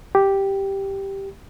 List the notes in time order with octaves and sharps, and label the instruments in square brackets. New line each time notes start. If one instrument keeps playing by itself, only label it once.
[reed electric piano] G4